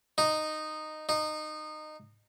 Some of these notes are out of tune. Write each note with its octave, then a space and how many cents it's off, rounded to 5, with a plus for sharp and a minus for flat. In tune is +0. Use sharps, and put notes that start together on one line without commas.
D#4 -10
D#4 -20